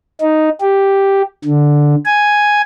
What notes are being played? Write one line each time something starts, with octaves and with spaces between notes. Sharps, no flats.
D#4
G4
D3
G#5